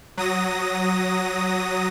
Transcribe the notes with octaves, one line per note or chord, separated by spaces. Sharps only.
F#3 D#6 A#6